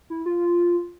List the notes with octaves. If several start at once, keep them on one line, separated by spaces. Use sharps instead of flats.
E4
F4